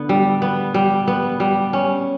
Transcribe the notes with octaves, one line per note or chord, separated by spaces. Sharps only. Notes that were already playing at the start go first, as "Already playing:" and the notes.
Already playing: D3 B3
G3
B3
G3
B3
G3
C#4